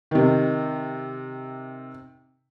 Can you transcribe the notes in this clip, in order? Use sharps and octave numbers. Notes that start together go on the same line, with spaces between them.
C3 D#3